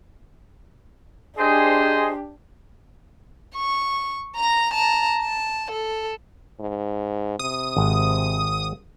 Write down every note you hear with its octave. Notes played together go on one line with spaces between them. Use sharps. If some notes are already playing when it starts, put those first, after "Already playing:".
D4 G4 G#4 C5 D#5
C#6
A#5 A#6
A5 A#5
A5
A4
G#2
C3 D#6
G#1